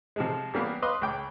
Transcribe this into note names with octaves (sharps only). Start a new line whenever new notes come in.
C3 F3 G#3
E3 G3 A#3 B3
B4 D#5 F5 C6 D6 D#6
C#2 G5 D6